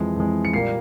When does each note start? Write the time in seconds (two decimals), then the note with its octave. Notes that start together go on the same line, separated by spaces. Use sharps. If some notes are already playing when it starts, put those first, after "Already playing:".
Already playing: F2 E3 G#3
0.16 F2 E3 G#3
0.45 C#7
0.53 A#2 G3 A#3 C7